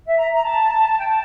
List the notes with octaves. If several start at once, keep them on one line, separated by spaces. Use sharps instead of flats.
E5
A#5
A#5
A5
G5
A5